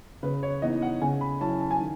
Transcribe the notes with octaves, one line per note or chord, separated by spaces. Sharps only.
C#3 B4
C#5
E3 B3 D#4 D#5
F#5
C#3 G#5
B5
F#3 C#4 E4 A5
A5
G#5
D#3